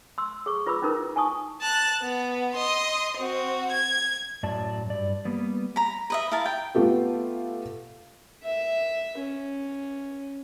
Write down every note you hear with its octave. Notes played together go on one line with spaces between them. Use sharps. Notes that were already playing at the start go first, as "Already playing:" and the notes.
C6 E6
G#4 C#6
F4 B4 B5 D6 E6
C#4 D#4 E4 A#4 B4
F4
G#5 A5 C#6 D#6
A5 F#6
B3
D#5 C6
C4 F#4
G#6
F#2 A2 F#3 D5 A5
G2 D5
G3 A#3 B3
A#5 B5
B4 D#5 E5
E4 A#4 F5 A5
G5
A3 B3 F4 G4 A4
E5
C#4